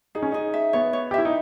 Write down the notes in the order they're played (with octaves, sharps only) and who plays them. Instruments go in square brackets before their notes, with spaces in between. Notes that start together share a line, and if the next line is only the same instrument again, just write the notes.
[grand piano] D#4 [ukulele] G#4
[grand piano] C#4
[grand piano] D#4 [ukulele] G#4
[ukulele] E5
[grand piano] B3 [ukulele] C#5
[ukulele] C#5
[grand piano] G4
[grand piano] E4 [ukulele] E5
[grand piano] D#4